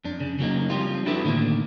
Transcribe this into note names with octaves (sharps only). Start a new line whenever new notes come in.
F2 D4
C#3
C#3 F#3 A#3 D#4
F3 G3 C4 F4
D4 E4 F#4 A4 B4
A2 D3 D#3 G#3 A#3